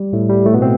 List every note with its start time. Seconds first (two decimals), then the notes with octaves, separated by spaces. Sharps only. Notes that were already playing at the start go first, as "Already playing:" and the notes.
Already playing: G3
0.13 A2 A3
0.29 G3
0.46 A2 A3
0.54 B2 B3
0.62 C4